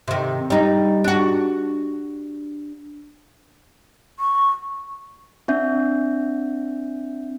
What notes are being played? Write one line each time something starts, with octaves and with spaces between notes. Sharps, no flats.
C3 D#3
G3 D#4
D4 F#4
C#6
C4 D4 E5 G6